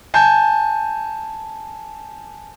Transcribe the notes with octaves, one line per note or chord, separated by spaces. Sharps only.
G#5 A5 G6